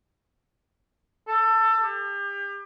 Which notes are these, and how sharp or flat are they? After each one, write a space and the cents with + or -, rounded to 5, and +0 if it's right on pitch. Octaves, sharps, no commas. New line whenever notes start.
A4 +20
G4 +35